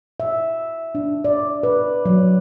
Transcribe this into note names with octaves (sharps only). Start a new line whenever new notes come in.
E5
D4
D5
B4
F#3